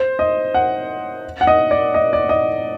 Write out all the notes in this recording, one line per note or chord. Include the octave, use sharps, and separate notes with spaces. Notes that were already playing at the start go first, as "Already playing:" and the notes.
Already playing: C5
D#5
F#5
F#5
D#5
D5
D#5
D5
D#5